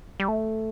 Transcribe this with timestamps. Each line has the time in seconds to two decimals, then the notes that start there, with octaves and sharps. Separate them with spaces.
0.20 G3
0.28 A3